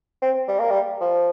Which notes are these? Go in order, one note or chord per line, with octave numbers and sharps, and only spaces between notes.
C4
G3
A#3
G3
F3